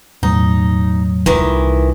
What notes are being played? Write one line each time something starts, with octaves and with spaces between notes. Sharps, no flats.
E1 A2 F#3 D#4
C2 A#2 D#3 E3